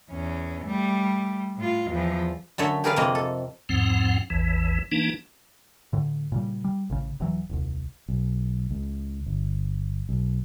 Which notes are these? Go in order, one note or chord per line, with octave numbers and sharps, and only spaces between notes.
E2 C#4
G3 A3
A2 F4
E2 F3
F#2 D3 A3 C#5 E5
G4 G#4 A#4 B4 D5 F5
F2 C3 A#3 D#5
A4
E2 G#2 F3 C4 F#5
A1 E2 E3
E3 A#3 D4 D#4
A2 D3
A#2 C#3 G3
G3
A1 C#3
E1 E3 F#3
D#1 C2
B1
C#2
G1
B1